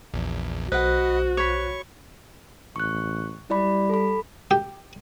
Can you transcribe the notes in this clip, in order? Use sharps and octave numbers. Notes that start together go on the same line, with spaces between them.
A#1 E2
B1 F#4 B4 C5 D#5 F#5 F#6
C#5 B5 C#6
A1 C#6 F#6
G3 E4 D5 B5
A4 B5
G4